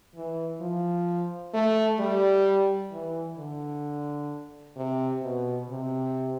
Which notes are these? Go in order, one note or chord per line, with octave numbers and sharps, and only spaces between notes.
E3
F3
A3
G3
E3
D3
C3
B2
C3